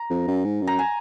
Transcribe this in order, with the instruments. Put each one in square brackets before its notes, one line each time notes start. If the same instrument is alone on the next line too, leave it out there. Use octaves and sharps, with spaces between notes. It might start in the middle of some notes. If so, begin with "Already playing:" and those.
Already playing: [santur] A#5
[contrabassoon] F2
F#2
G#2
F#2
[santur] A#5
G#5